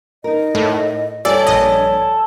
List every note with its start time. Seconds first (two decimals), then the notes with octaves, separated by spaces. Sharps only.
0.24 D#4 A#4 D#5
0.55 A2
1.25 G2 A4 C#5 D5 F#5 G#5
1.47 A#1 D#5